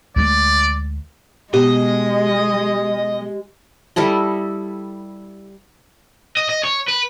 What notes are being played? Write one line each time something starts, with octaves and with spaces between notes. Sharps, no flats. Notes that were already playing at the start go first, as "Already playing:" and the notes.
D2 G#3 A3 D5
B2 G#3 G4 D#5
G3 E4 A4 D#5
D#5
D#5
C#5
B4